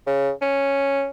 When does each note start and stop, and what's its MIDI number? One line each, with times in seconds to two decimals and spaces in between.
0.07 0.31 49
0.42 1.08 61